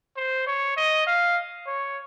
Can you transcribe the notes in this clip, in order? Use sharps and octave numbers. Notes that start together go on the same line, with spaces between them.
C5
C#5
D#5
F5
C#5